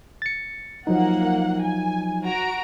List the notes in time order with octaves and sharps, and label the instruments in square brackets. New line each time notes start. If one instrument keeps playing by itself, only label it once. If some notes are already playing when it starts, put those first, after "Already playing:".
[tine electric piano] A6 C#7
[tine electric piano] F3 F#3 D#4 [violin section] A#3 F#5
[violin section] G#5
F#4 A#5 D7